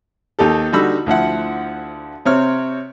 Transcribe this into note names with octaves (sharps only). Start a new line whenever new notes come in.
D#2 D#4 G4 A4
D3 G3 D#4 F#4 B5 E6
D2 F3 E4 F#5
C3 C4 C#5 F6